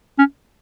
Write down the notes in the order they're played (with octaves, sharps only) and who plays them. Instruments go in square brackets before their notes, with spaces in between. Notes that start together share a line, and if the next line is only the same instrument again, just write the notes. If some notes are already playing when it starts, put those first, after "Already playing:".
[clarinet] C#4